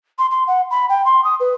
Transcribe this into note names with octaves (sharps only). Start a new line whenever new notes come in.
C6
C6
F#5
B5
G5
C6
D#6
B4